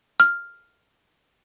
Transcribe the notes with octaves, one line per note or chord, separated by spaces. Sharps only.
F6